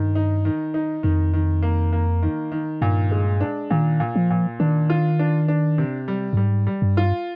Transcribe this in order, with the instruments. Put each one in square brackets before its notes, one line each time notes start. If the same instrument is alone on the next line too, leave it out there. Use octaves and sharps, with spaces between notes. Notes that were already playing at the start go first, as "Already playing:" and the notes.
Already playing: [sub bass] G2 [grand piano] D#3
[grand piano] D#4
D#3
D#4
[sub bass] F2 [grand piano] D#3
[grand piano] D#3
A#3
A#3
D#3
D#3
[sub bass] G2 [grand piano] A#2
[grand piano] G#3
D4
[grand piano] A#2 [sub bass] D#3
[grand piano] A#2
[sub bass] F3
[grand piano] A#2
[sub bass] D#3 [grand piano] D4
[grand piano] F4
D4
D4
C3
G3
[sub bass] G2
[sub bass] G#2 [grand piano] G3
[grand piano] G3
[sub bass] G2
[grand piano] F4